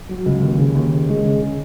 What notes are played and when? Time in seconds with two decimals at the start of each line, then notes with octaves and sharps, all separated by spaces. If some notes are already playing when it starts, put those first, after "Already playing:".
0.09 F#3
0.26 C#2
0.42 D#2
0.59 C#3
0.75 D#2
0.92 C#3
1.09 G#3
1.25 C#3
1.42 C#3